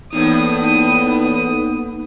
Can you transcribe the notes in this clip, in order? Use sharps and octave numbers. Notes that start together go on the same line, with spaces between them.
E2 A2 A#3 B3 D#4 D#6